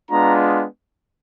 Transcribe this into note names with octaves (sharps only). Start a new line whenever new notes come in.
G#3 B3 D4 F4 A#5